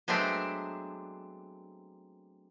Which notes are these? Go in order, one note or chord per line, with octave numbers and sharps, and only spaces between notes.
F#3 G#3 A3 B3 C4 D4